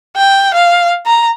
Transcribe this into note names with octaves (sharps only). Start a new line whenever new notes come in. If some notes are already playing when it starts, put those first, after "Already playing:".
G5
F5
A#5